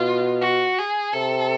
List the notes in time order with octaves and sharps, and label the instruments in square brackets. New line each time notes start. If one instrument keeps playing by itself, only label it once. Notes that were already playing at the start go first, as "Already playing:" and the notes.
Already playing: [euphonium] B2 [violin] F4
[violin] F#4
G#4
[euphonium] C3 [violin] A4